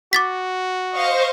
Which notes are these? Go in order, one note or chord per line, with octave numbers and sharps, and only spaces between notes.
F#4 D6 A6 B6
C5 D#5 F5 C#6